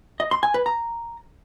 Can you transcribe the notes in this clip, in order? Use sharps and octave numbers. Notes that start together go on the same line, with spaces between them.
D#5
C6
G#5
B4
A#5